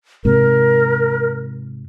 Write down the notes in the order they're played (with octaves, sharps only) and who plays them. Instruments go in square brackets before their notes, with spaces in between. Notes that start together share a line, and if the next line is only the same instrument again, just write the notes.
[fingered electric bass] G#2 C3 [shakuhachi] A#4